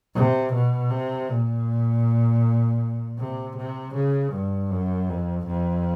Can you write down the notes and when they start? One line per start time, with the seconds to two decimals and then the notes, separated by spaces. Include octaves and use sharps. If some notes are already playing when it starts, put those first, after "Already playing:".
0.15 C3
0.53 B2
0.90 C3
1.29 A#2
3.19 C3
3.57 C3
3.94 C#3
4.32 G2
4.71 F#2
5.09 F2
5.47 F2